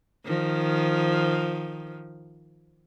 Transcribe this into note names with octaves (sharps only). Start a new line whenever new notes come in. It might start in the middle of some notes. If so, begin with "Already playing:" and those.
D#3 F3